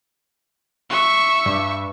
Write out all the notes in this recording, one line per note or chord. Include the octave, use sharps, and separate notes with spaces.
E5 C#6
G2